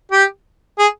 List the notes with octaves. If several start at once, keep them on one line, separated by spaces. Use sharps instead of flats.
G4
G#4